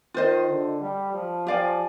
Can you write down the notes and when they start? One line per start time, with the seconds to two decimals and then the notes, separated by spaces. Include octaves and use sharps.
0.14 D#3 F4 C5 D#5
0.48 D3
0.81 G3
1.13 F3
1.47 F3 G4 D5 F5 G#5